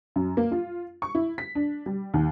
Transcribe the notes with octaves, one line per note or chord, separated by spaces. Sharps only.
F#2
A#3
F4
C#6
E4
B6
D4
G3
D#2